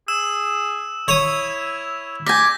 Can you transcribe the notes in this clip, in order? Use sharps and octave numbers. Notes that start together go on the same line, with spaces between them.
G#4 E6 E7
E4 C#5 D#6
D5 G#5 G6 A#6 B6